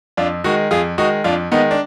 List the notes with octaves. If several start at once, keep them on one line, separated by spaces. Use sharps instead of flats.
F2 D4 F4
D#3 G#3 D#4 F#4
F2 F4 G#4
D#3 G#3 D#4 F#4
F2 D4 F4
D#3 G#3 B3 D#4
D4